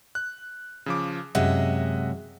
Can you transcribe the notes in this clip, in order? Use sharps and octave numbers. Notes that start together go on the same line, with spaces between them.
F#6
C#3 F3 D6
F#2 C3 G#3 D#5 E5 F#5